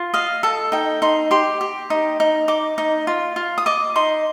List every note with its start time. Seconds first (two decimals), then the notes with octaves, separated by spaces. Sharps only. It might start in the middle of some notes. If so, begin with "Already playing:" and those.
Already playing: F4
0.14 D#5 F5
0.43 A4 A5
0.72 D#4 G5
1.02 D#4 C6
1.31 G4 C6
1.61 G4
1.90 D#4
2.20 D#4
2.48 D#4 D6
2.78 D#4
3.07 F4
3.36 F4
3.58 D#6
3.66 D#5 D6
3.96 D#4 C6